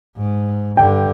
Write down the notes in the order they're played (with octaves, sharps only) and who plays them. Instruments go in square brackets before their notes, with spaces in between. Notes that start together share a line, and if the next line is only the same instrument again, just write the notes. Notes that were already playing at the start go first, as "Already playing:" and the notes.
[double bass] G#2
[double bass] G2 D3 [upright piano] G5